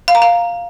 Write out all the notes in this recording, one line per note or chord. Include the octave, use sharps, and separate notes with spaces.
F5
A#5
F5